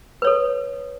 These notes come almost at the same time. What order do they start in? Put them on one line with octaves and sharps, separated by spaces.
B4 C#5 A4